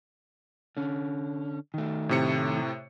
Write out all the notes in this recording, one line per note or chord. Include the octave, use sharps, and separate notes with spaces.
D3 C#4
D#3 A3
A2 C3 C#7